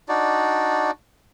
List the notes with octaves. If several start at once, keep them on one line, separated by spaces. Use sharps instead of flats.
D4 D#4 F#4 D5